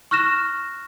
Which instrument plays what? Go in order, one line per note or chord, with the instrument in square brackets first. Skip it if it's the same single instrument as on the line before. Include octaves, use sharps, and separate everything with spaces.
[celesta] C#6 F6 F#6 A#6 E7